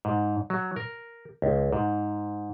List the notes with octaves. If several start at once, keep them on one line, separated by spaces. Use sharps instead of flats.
G#2
F#3
A#4
C#2
G#2